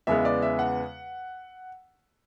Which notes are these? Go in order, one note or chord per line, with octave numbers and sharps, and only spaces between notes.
E2 C#3 G#3 B3 E5
D5
E5
F#5